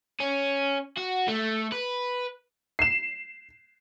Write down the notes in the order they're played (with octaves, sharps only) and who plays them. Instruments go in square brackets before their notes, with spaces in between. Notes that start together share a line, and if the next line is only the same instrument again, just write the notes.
[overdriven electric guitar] C#4
F#4
A3
B4
[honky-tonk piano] C7 E7